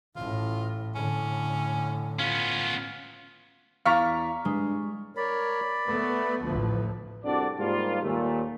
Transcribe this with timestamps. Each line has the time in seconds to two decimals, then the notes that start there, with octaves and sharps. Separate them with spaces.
0.16 A1 A2 F4
0.95 A2 D3 C#4
2.19 B3 C#4 F4
3.86 E2 D5 F5 A#5 C#6 F6 B6
4.45 G2 G#3
5.17 A#4 C#5 D5 B5
5.86 A3 B3 B4
6.41 A1 D2 F3
7.24 C2 C4 D4 F#4 A4 D5
7.59 G#2 G3 A#3 F4
8.03 D#2 A#2 A3